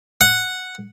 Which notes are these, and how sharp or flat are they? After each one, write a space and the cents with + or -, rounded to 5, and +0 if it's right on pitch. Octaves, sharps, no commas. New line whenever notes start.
F#5 -5